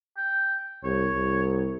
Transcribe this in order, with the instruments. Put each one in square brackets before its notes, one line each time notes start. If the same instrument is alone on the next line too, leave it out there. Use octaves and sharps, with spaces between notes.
[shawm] G5
[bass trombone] C2 [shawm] C#5
[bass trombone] C2